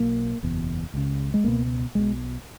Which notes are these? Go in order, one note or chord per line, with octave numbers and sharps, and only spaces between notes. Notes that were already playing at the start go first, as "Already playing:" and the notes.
Already playing: B1 B2 A#3
F#1 E2 B2
C#2 C#3
G#3
C#2 B2 A#3
B1 B2 G#3